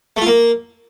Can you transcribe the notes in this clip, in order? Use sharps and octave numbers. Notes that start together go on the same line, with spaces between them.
A3
F4
A#3